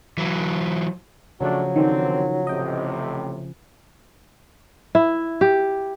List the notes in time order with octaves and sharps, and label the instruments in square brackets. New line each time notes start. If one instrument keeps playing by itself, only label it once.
[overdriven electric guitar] E3 F#3
[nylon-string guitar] C#3 F3 [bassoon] F#3 [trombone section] A3 D4 F#4
[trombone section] D3 C4 [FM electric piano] D#3
[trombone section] A1 A2 C3 [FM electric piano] D#5 G5
[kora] E4
G4